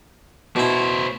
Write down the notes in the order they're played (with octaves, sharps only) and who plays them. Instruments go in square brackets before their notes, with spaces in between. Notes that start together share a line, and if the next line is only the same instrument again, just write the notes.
[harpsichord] B2 E4 [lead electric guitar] A3 C5